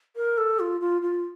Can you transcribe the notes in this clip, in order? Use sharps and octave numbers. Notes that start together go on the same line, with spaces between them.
A#4
A4
F4
F4
F4